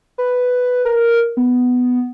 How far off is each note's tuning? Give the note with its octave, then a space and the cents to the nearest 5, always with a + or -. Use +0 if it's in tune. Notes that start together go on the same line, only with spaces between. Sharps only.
B4 +5
A#4 +0
B3 +5